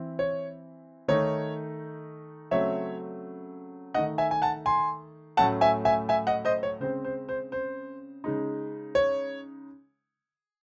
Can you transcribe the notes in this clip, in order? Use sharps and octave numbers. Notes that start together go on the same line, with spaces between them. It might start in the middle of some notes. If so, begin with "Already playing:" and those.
Already playing: E3 C4 E4
C#5
D#3 A3 D#4 C#5
C#3 F#3 A3 C4 C#5 E5
D#3 A3 D#4 D#5 F#5
E5 G#5
G#5
F#5 A5
G#5 C6
A2 F#3 A3 C#4 F#5 A5
E5 G#5
E5 G#5
E5 G#5
D#5 F#5
C5 D#5
C#5
C#3 G#3 C4 C5
C5
C5
C5
C#3 G#3 D#4
C#5